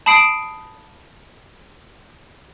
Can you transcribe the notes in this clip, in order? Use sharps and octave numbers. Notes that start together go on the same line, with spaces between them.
A5 B5 D#6 C7 D7